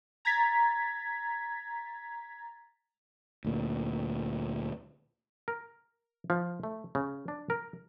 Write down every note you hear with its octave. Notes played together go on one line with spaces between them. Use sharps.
A#5 G#6 A6 B6
D2 A#2
A#4
F3
A3
C#3
D4
A#4